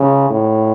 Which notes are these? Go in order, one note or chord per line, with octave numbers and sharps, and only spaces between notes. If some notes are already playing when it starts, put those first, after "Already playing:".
Already playing: C#3
A2